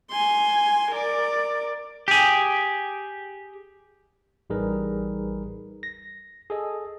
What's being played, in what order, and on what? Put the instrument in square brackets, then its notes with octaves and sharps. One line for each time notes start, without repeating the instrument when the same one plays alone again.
[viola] G#5 C6
A#4 D5
[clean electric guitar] G4 G#4
[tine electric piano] A1 G3 D#4 G#4 A#4 B4
A#6
G#4 A4 D#5